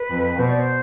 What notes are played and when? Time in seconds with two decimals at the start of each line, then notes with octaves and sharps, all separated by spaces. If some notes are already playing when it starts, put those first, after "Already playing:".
Already playing: B4
0.10 F2
0.38 B2 C5
0.49 D5
0.59 C5